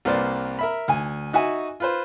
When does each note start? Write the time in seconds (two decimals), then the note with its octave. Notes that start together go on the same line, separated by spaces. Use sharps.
0.05 C2 A#3 B4 C5 D5
0.59 A#4 E5 B5
0.88 D2 G#5
1.33 D#4 F#4 E5 G#5
1.80 F4 B4 C5